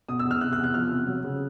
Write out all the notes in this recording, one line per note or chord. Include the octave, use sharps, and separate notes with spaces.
B2 D#6
E6
E2
F6
C3 F#6
F#6
E2
F#6
F3 F6
C3
F#3
C#3